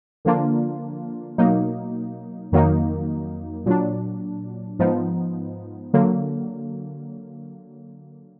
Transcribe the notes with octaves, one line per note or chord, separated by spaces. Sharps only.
D3 F3 A#3 D4 F4
B2 F#3 A#3 D#4
F2 D#3 F#3 A#3 D#4
A#2 F#3 D4
G#2 F3 B3 D#4
D3 F#3 A#3